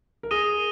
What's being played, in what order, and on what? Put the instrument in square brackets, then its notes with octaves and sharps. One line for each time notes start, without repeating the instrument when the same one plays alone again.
[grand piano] A#4
[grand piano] G#4 [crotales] D#6 A#6 D#7 G7